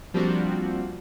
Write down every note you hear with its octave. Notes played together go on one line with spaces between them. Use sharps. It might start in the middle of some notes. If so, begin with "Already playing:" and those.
F3 G3 A#3 C4 D4 F#4